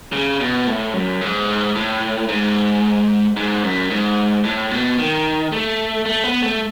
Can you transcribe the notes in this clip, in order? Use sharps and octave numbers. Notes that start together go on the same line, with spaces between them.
C#3
B2
A2
F#2
G#2
A2
G#2
G#2
F#2
G#2
A2
B2
D#3
A3
A3
B3
A3